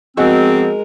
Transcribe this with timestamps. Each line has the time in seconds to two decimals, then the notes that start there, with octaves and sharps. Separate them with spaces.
0.17 F3 G#3 B3 C4 F#4 G#4 A#4 D#5